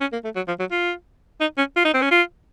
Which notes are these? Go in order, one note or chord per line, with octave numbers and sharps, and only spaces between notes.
C#4
A#3
A3
F#3
F3
F#3
F4
D#4
C#4
F4
D#4
C4
C#4
F4